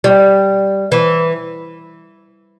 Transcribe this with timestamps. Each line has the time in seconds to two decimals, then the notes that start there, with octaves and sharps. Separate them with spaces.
0.04 G3
0.92 E3